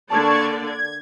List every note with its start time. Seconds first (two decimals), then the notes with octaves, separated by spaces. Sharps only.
0.10 D3 A#3 D5 A5 C#6 G#6
0.67 G#6